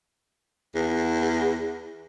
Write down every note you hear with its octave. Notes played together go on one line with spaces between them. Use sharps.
E2